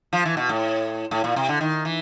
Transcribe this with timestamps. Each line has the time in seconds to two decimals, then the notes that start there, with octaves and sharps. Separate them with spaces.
0.13 F3
0.25 E3
0.37 B2
0.49 A2
1.11 A2
1.24 A#2
1.36 C3
1.49 D3
1.61 D#3
1.85 E3